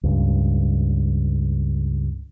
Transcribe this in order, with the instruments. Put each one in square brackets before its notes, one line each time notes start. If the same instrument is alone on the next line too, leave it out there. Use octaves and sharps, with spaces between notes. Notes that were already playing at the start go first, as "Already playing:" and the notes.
[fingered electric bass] C#2 G2